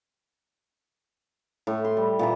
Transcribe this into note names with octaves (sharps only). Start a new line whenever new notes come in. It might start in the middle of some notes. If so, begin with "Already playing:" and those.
A2
C6
G3
A#2 E3 A#5